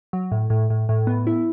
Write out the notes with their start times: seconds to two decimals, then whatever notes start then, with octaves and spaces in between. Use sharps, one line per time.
0.13 F#3
0.32 A2
0.50 A2
0.70 A2
0.89 A2
1.07 B3
1.27 E4